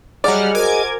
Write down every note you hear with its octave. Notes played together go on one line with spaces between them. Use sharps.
F#3 G3 G#4 D5 D#5 F#5 F6
F#4 A#4 C5 G#5 D6 G#6